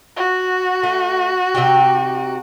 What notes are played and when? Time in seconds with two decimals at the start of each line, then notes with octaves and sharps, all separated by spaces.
0.17 F#4
0.83 A3
1.54 C3 D#4 G4